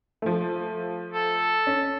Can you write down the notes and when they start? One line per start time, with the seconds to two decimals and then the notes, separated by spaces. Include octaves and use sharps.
0.22 F3 A3
1.13 A4
1.67 C#4